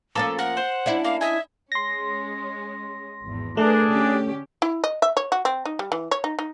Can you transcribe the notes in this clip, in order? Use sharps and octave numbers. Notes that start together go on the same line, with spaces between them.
F3 A#3 C#4 A4 A#5 D6
A#4 F#5
C5
C#4 D4 E4
A#3 F5
D#5 E5 G#5
G#3 C#4 C6 A#6
G#1 E2
A3 D4 G#4 A#4 B4
D3 C#4 G4
E4
D#5
E5
C#5
F#4
C4
D#4
G3
E3
C#5
D#4
D#4